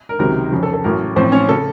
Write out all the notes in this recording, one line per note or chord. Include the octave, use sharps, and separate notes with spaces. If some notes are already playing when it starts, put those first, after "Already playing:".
A#4
C#2 C3 D#3 F#3 A#4
F2 C#3 F3
A4
A4
A1 A2 F#3 A#4
A1 A2 F3 C4 C5
C#4 C#5
C#3 A4